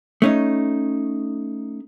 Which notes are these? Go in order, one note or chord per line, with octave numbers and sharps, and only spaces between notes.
A3 C#4 D#4